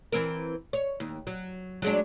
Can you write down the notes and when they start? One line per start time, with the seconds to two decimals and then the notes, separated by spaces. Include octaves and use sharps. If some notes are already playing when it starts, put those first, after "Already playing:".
0.12 E3 C4 A#4
0.73 C#5
1.00 D#2
1.27 F#3
1.82 F#3 G#3 D4